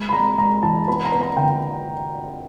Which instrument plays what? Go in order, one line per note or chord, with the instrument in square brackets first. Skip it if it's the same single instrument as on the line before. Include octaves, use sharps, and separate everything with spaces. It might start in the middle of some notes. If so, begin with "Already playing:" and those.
Already playing: [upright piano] G#3
B5
G#3 A#5
G#3 A#5
E3 A5
B3 B5
A#5
B3
A#5
D3 G5